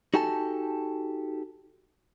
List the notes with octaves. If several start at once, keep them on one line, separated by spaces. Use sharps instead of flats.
D#4 F#4 G4 A4 G#5 A5